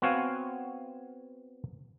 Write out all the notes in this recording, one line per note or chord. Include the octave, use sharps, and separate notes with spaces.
B3 C4 F#4 C#5 F5 G#5